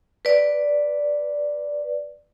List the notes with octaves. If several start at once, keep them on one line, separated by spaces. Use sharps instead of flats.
B4 D5